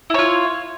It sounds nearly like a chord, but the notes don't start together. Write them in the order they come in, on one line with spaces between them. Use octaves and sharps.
E4 C#5 F4